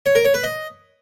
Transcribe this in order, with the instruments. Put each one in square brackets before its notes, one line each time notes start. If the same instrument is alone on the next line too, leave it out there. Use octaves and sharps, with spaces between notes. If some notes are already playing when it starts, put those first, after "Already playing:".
[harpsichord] C#5
A#4
C#5
B4
D#5